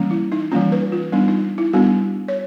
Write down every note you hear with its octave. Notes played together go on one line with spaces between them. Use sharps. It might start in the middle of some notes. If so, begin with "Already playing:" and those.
Already playing: E3 G3 A#3 C#4
E4
D#4
E3 G3 A#3 C#4 F4
B4
F4
G3 B3 D4 D#4
D#4
E4
G3 B3 D4 F#4
C#5